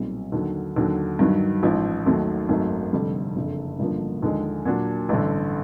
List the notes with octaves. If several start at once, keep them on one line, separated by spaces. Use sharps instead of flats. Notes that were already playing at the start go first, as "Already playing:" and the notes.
Already playing: B1 A#2 G3 C4
D#2 D3 F#3
D#2 D3 F#3
G2 D#3 F#3
A1 G#2 F3
D#2 D#3 F#3 A3
G#1 F#2 D#3 F#3 A3
F1 F2 D3 G3
F#1 F2 D3
A1 G2 D3 F3 A#3
D#2 D3 F3 G#3
A#2 F#3 A#3 D4 F#4
A1 G2 D3